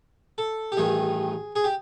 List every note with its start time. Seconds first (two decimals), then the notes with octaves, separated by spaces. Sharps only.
0.38 A4
0.72 G4
0.77 A1 G2 D#3 G#4
1.56 G#4
1.64 G4